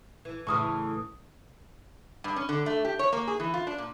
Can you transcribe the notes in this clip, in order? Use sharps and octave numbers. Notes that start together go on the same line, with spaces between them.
E3
A2 C#3 E3 C#6 D#6 F6
G2
C#4
D3
A3
G4
C#5
A#3
G#4
E3
F4
D4
A#2